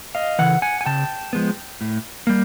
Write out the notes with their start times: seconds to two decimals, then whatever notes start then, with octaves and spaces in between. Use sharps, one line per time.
0.15 D#5 F5
0.39 C#3 E3 F#5
0.62 F#5 G#5
0.81 G#5
0.86 C#3 G5 A5
1.33 F3 G#3 B3
1.81 A2
2.27 G3 A#3